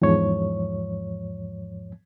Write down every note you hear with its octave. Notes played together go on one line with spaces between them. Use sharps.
E2 G#2 F3 C#5